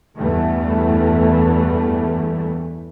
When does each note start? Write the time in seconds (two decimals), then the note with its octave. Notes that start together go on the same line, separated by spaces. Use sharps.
0.18 E2 G2 E3 A3